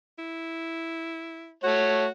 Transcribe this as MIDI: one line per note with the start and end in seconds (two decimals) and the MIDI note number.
0.19 1.53 64
1.64 2.06 57
1.64 2.09 66
1.64 2.06 73